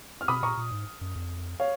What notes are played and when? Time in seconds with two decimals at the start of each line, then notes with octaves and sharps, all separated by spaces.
0.21 F6
0.28 B2 B5 D#6
0.43 A#2 A#5 C#6
0.57 A#2
0.72 G#2
1.01 F#2
1.16 F2
1.60 C#5 F5